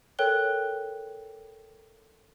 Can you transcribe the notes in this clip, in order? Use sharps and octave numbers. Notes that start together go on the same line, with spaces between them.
A4 A#4 C#5 G5 F#6 G7